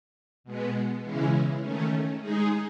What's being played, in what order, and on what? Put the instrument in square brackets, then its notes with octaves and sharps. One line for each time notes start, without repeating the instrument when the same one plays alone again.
[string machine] B2 G#3 B3
C#3 E3 G#3 C#4 E4
D#3 A3 C#4
G#3 D#4 G#4